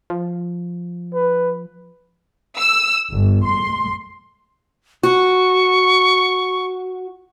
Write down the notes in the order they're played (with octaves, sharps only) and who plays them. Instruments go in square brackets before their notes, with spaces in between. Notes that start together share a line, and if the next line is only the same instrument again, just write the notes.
[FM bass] F3
[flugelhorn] B4
[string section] E6
G1
C6
[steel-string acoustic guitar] F#4 [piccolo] C#6